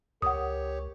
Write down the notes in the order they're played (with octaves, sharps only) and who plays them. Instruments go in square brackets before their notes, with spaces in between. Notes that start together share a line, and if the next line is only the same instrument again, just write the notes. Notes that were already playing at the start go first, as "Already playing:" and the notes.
[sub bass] C#2 [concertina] G4 C#5 [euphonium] A#4 [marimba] F#5 D#6